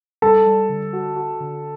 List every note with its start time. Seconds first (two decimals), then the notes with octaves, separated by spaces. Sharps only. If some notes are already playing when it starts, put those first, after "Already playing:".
0.22 G3 A4 A5
0.46 G3
0.69 D3
0.93 F#4
1.16 F#4
1.40 D3